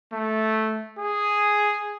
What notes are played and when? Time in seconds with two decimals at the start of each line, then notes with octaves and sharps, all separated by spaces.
0.12 A3
0.98 G#4